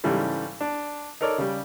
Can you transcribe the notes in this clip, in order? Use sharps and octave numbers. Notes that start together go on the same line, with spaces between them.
G#2 C#3 E3 G3 A3
D4
D#4 A4 A#4 C#5 D5
C#3 G3